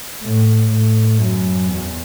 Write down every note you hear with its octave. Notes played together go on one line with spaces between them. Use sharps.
A2
A2
F#2
E2